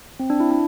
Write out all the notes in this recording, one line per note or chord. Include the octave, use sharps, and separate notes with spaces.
C4
D4
E4
D4